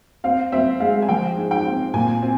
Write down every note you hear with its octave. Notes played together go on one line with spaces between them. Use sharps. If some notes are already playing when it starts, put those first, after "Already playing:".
C4 F5
C4 E5
G#3 F5
G#5
F3 G5
G#2
G5
C4
A#2 G#5
C4